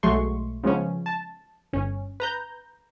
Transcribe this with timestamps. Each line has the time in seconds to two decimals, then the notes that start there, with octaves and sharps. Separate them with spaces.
0.03 B1 F#3 G#3 A3 C6 C#6
0.64 C#3 F3 G#3 B3 C#4
1.06 A5
1.73 G1 C#4
2.20 B4 A#5 G6